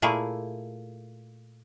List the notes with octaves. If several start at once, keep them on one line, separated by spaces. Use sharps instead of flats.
A#2 A3 A#3 E4 G#4